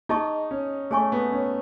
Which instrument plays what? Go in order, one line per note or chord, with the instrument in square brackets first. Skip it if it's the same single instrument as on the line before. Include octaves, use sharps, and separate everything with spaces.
[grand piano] D#4 [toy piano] G#4 D#5 A5 C#6
[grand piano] C#4
[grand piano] A3 [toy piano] G#4 C#5 G#5 C#6
[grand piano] B3
C#4